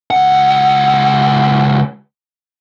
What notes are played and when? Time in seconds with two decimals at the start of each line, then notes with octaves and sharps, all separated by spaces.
0.11 C#2 F#5